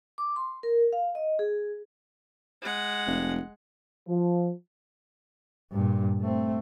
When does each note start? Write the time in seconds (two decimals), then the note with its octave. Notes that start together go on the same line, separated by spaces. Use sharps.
0.18 D6
0.36 C6
0.63 A#4
0.93 F5
1.15 D#5
1.39 G#4
2.62 G#3 F#5
3.06 F1
4.08 F3
5.72 G2 A#2
6.21 A3 C4